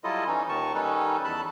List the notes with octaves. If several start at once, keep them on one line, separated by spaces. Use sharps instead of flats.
F#3 G3 E4 F4 A4 D#5
E3 C#4 D#4
D#2 A#2 D#3 A5 C#6
D#3 G3 C#4 D#4 A4 B4
E2 A4 A5 B5 F#6